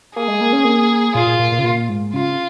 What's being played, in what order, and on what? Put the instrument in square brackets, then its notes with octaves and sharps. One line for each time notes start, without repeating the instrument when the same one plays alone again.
[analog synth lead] A#3 [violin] G#4
[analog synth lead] G#3
A#3
C#4
A#3
[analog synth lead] A#2 [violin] F4
[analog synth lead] A#2
A#2
A#2
C#3
A#2
G#2
[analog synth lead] C#3 [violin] F4